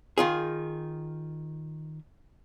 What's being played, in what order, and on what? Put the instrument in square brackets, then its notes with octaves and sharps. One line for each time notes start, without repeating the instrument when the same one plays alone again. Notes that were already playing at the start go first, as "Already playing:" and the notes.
[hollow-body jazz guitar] D#3 F4 G#4